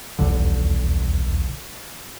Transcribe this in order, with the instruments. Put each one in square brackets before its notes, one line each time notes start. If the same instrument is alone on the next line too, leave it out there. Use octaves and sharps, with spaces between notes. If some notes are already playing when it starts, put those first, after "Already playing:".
[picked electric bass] D#1 B1 E2 D3